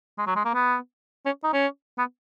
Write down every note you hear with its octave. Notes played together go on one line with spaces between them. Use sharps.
G#3
F#3
G#3
A#3
B3
C#4
D#4
C#4
B3